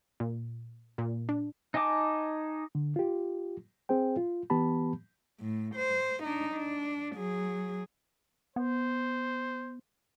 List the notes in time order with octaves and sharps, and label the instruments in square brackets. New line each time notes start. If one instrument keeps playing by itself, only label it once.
[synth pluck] A#2
A#2
D4
[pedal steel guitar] D#4 D#5 G#5 A5 D6
[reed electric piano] D3
F4 G4
C4 G#4 C5 G5
F4
E3 B3 G4 A5 B5
[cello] A2
C5
D4 D#4
D4
F#3 G#4
[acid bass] B3 [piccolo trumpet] C5